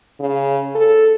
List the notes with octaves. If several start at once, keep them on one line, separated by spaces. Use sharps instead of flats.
C#3
A4